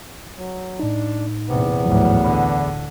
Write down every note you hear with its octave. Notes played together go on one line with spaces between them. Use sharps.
F#3
A2 D4 D#4
A#1 E2 C3 B3
A1 D2 G#2 F3 F#3
D3 B5